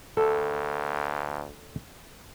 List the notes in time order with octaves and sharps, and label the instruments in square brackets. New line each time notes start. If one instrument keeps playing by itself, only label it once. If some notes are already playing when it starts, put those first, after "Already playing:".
[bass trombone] D2 [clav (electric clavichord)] A4